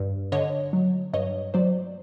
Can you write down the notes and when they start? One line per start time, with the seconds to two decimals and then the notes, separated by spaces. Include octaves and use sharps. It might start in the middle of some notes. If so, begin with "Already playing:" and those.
Already playing: G2
0.32 D3 C#5 D#5
0.73 F#3
1.13 G2 C#5 D#5
1.54 F#3 C5 D5